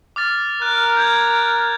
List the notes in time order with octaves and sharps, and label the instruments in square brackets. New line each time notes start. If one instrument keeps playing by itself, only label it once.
[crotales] D6 F6 A6
[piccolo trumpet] A#4 [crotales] F#6
[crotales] G6 G#6